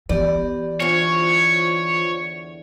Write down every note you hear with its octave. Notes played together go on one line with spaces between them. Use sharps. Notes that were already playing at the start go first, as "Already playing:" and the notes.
E3 B3 G4 D5
E2 D3 F4 C5 C#5